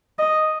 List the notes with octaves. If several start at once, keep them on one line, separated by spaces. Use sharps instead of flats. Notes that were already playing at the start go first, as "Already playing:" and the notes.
D#5